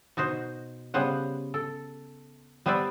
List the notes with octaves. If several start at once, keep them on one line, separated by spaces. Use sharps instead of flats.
B2 D#4 F#4 C5
C#3 G3 B3 C5 F#5
A4
G3 B3 B4 C5 D5 E5